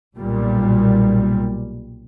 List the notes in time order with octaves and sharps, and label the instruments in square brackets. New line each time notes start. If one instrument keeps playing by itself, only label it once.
[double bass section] B1 A#2 G3